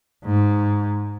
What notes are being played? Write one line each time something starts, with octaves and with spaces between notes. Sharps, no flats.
G#2